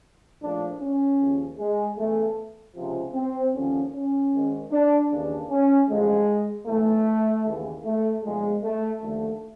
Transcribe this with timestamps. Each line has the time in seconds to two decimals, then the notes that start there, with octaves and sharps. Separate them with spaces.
0.41 A#1 A2 F3 D4
0.80 C#4
1.19 D#2 C#3 F3
1.59 G#3
1.98 E2 C#3 E3 A3
2.76 C#2 C3 F3
3.15 C4
3.54 D#2 D3 F3 C#4
3.94 C#4
4.33 G#1 G#2 D#3
4.72 D4
5.11 D#2 C#3 E3 D4
5.50 C#4
5.89 A1 G2 D3 F3 G#3
6.67 B1 A2 E3 A3
7.46 D#2 C#3 E3
7.85 A3
8.24 B1 A#2 F3 G#3
8.63 A3
9.02 D#2 D3 F3 A3